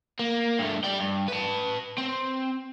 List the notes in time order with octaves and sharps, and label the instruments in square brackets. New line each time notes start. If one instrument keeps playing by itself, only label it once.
[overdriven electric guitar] A#3
G2 A3
G3 G5
G2
B4 A5
C4